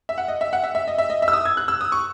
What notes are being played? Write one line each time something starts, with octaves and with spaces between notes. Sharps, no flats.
E5
F#5
D#5
E5
F#5
E5
E5
D#5
E5
D#5
E5
E6
D#6
G#6
F#6
E6
D#6
C#6